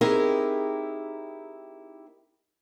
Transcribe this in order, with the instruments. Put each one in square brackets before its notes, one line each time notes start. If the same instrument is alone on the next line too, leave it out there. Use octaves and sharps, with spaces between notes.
[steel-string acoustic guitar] C4 D#4 E4 G4 G#4 A#4